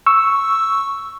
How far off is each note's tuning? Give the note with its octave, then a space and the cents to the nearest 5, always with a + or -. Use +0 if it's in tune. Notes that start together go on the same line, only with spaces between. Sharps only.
C#6 +0 E6 +0